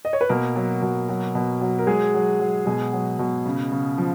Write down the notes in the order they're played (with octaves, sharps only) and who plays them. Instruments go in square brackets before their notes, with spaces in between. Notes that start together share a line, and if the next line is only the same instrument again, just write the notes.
[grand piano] D#5
C#5
B4
B2 A#3 A#4
F#3
B2
F#3
B2
F#3
A#4
F#3 G#3 G#4
F#3
F#3
B2 G#3 G#4
F#3
B2
C#3
C#3
F3